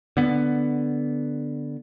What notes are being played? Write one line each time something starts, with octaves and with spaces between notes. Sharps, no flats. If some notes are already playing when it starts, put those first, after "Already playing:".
D3 B3